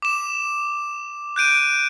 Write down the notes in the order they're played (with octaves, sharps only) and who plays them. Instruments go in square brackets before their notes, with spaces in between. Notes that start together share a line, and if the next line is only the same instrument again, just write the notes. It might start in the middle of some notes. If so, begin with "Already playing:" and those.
[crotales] D6 E7
F#6 G6 D7 D#7